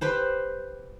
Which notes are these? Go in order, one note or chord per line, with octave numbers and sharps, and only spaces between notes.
G4 B4 C5